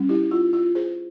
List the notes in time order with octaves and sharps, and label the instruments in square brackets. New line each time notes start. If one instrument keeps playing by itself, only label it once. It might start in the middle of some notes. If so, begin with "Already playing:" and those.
Already playing: [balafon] G3 C#4
E4 G4
F4
F4
G#4 C5